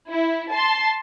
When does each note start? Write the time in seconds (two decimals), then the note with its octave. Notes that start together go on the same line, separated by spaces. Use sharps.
0.10 E4
0.51 A5 C6